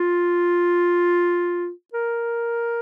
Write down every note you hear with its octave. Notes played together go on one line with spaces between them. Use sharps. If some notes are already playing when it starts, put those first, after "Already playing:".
Already playing: F4
A#4